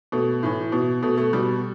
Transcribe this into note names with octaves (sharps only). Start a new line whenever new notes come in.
B2 A3
A2 E3
B2
B2 A3
A3
B2 G3